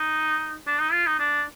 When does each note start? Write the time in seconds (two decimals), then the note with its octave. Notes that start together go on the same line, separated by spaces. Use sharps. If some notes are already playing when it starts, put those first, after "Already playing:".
Already playing: D#4
0.67 D4
0.80 D#4
0.92 F4
1.07 D#4
1.19 D4